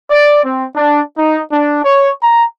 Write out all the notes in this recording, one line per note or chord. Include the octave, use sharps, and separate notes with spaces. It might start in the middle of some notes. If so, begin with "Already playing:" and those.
D5
C4
D4
D#4
D4
C#5
A#5